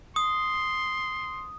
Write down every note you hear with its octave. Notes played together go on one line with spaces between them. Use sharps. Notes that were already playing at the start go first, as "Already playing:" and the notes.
C6 D#6